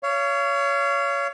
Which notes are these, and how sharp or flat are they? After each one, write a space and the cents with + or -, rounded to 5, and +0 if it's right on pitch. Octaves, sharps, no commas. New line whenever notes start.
C#5 +25 F5 -30